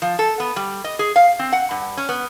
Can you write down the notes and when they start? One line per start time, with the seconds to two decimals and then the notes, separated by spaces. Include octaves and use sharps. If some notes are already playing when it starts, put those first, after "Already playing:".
0.02 F3
0.19 A4
0.40 B3
0.56 G3
0.84 D#5
0.99 G#4
1.16 F5
1.39 C4
1.52 F#5
1.71 G2
1.97 C#4
2.09 B3